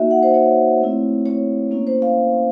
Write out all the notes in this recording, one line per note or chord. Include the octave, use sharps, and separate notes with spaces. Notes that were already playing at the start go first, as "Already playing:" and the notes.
Already playing: A#3 D#4 F#4 E5
F#5
C5
C#5
A3 C4 E4
C#5
A#3 C#4 E4
C5
F5